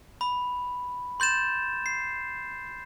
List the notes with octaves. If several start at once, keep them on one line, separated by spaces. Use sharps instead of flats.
B5
C6 G6 A6 E7
C7